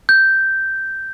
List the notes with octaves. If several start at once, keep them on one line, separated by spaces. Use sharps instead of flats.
G6